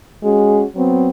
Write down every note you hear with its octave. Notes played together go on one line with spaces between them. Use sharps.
G#3 C#4 F#4 G#4
F#3 B3 C4